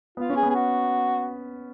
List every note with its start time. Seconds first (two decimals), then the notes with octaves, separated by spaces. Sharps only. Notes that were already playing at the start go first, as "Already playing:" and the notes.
0.17 B3 F4
0.30 C#4
0.36 G#4
0.43 B3
0.50 G#4
0.55 F#4